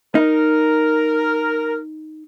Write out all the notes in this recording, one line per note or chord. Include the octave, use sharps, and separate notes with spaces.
D#4 A#4